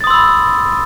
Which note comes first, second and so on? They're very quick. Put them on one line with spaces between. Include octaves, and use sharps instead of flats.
A6 D#6 C6 E6 B5